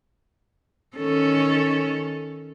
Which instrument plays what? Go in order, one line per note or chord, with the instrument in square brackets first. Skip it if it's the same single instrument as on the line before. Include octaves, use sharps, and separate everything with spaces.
[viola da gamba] D#3 C#4 A4